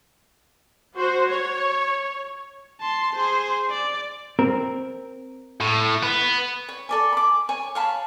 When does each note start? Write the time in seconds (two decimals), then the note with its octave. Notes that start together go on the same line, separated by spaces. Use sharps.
0.97 F#4 C5
1.28 C#5
2.80 A5 C6
3.13 G#4 C5
3.70 D5
4.39 C4 A#4
5.60 A2
6.03 B3
6.69 C#5
6.89 A4 D5 G#5
7.13 B5 D6
7.49 C#5 G#5
7.75 C#5 F5 A5 B5